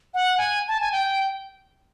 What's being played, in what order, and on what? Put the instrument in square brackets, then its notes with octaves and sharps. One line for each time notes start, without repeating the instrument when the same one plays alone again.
[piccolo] F#5
G#5
A5
G#5
G5